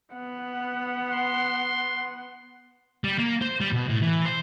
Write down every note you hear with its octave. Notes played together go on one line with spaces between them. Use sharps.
B3 F#5
C6
G3
A#3
C5
G3
B2
A2
E3
C5